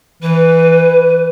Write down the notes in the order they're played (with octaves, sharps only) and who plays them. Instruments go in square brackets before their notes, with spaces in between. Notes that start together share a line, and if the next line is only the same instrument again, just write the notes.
[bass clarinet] E3 [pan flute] B4